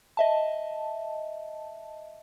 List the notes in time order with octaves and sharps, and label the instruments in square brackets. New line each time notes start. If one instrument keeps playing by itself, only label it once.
[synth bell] D#5 E5 A5